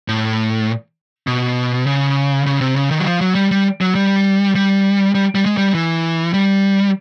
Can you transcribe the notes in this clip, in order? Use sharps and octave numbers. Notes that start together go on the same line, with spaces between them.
A2
B2
C#3
C#3
C3
C#3
D#3
F#3
F3
F#3
G3
G3
F#3
G3
G3
G3
G3
G#3
G3
E3
G3